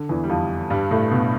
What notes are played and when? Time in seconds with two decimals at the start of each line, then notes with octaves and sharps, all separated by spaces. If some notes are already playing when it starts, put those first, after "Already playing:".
Already playing: D3
0.09 E2 E3
0.24 G3
0.29 F2 F3
0.70 G2 G3
0.91 A2 A3
1.11 B2 B3